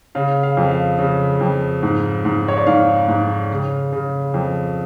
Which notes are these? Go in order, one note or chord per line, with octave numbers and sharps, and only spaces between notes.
C#3 F5
F5
F2
F5
C#3
F2
G#2
G#2
C#5
D5
G#2 F5
G#2
C#3
C#3
F2